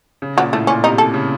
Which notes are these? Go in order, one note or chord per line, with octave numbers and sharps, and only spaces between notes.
C#3
A#2 F#3
A2 A3
A#2 C#4
C3 D#4
A4
C#3